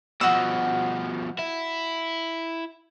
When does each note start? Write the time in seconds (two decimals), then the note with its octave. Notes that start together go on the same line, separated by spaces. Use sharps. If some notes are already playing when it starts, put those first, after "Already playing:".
0.21 B2 F3 F#4 D#5 E6
1.39 E4